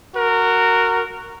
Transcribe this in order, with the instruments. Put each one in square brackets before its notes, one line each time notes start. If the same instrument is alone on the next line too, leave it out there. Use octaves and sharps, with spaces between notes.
[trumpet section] F#4 A#4